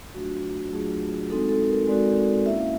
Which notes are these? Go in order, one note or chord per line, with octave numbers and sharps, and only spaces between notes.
F#3 A3 D4 F4 F#4
F#3 A3 D4 F4 G#4
G#3 C4 D#4 F#4 A4
A4
A#4
G#3 C4 D#4 F#4 D5
A#3 C#4 E4 E5
F5